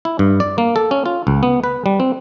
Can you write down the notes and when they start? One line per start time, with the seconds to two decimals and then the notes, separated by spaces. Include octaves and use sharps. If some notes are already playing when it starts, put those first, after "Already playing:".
0.05 E4
0.19 G2
0.40 D5
0.58 A#3
0.76 A4
0.91 C#4
1.06 F4
1.27 C#2
1.43 B3
1.64 B4
1.86 G3
2.00 C4